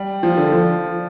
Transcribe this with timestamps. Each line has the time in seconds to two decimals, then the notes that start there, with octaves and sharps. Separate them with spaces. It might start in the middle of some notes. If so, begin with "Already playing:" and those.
Already playing: G3
0.23 F3
0.37 D3
0.52 F3